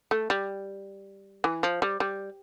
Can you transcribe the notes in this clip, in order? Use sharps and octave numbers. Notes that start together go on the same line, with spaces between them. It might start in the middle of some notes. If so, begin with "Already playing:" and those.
A3
G3
E3
F3
G3
G3